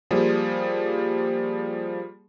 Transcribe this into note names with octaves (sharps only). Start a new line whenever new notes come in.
F3 G3 A#3 G#4